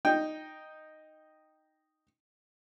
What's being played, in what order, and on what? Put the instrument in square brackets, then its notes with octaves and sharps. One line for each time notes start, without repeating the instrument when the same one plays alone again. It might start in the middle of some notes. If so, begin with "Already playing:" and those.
[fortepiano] D#4 G5